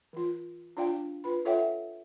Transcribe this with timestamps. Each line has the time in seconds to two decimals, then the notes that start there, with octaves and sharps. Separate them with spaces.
0.13 E3 F4
0.77 D4 F4 D5 F5 G5
1.24 F4 B4 B5
1.45 F4 A4 C#5 E5 F#5 G5